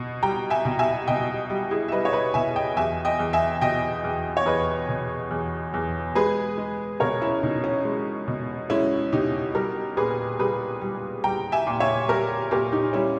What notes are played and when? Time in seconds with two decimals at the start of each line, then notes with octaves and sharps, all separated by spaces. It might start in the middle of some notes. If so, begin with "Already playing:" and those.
Already playing: B2
0.23 G3 G5 A#5
0.50 E5 G#5
0.65 B2
0.79 E5 G#5
1.08 B2 D#5 G5
1.50 G3
1.71 E4 G#4
1.88 E5
1.92 G3 B4 D#5
2.05 C#5
2.13 B4 D#5
2.34 B2 E5 G#5
2.56 D#5 G5
2.77 E2 E5 G#5
3.05 D#5 G5
3.19 E2
3.33 E5 G#5
3.61 B2 D#5 G5
4.04 E2
4.37 C#5
4.46 E2 B4 D#5
4.89 B2
5.31 E2
5.74 E2
6.15 G#3 G#4 B4
6.58 G#3
7.00 B2 A#4 C#5
7.22 C#4 E4
7.43 B2 D#4
7.64 C#4
7.85 G#3
8.28 B2
8.70 G#3 C#4 E4
9.13 B2 D#4 G4
9.55 G3 G4 A#4
9.97 A#2 G#4 B4
10.39 G3 G#4 B4
10.81 G3
11.24 G3 G5 A#5
11.52 E5 G#5
11.67 A#2
11.80 C#5 E5
12.09 G3 G4 A#4
12.51 A#2 G4 A#4
12.72 D#4 G4
12.93 G3 C#4 E4